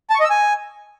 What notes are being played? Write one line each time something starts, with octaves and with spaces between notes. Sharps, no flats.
A5
C#6
D#5
E6
G#5